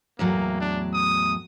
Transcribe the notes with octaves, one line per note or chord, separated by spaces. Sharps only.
E2 A2 F#3 A#3
D4
D#6